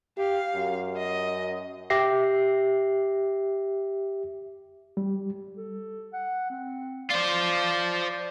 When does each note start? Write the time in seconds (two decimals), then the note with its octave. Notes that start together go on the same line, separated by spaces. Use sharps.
0.18 G4 F5
0.55 F#2
0.96 D#5
1.90 G4 E5 A#6 C7
4.97 G3
5.57 A4
6.13 F#5
6.50 C4
7.11 F4 C5 D5